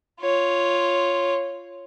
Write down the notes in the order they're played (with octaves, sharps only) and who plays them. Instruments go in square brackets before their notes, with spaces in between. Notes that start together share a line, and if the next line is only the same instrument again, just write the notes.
[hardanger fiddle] F4 C#5